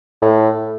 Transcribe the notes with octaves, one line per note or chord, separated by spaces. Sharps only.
A2